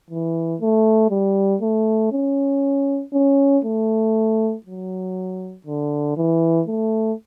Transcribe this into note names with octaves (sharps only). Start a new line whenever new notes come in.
E3
A3
G3
A3
C#4
C#4
A3
F#3
D3
E3
A3